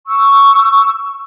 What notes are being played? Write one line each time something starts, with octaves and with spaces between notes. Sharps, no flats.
C#6 E6